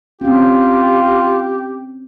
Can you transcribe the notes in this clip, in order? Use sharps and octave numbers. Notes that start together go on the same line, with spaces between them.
C4 C#4 F4 G4